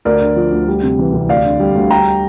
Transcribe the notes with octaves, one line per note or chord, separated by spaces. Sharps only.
D2 A#4 D5
D3
F3
D2
G3
C3
E3
C2
D2 D5 F5
D3
G3
D2
G3 G5 A#5